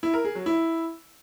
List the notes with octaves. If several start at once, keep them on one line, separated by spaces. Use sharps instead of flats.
E4
A#4
G#4
F#3
E4